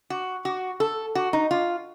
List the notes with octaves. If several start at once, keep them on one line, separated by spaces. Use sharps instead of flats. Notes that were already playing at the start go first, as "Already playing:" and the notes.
F#4
F#4
A4
F#4
D#4
F4